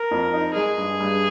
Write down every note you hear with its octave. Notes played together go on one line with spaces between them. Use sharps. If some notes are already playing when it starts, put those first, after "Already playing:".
Already playing: A#4
F2
D#4
G#3 G#4
G2
G2